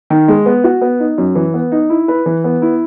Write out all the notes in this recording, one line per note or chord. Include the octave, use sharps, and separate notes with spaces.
D#3
G#3
B3
F#4
B3
D#4
F#2
E3
B3
D#4
E4
B4
E3
B3
E4